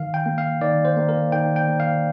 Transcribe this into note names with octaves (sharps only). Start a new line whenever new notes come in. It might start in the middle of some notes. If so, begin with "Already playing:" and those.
Already playing: D#3 F5
G5
A#3
F5
D#3 D5
C5
A#3
A#4
D#3 G5
G5
A#3
F5